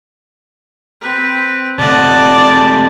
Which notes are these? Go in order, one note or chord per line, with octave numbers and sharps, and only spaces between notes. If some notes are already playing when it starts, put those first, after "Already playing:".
C4 B4
C3 A3 D5 D#5 F#5 A5
G#3 G4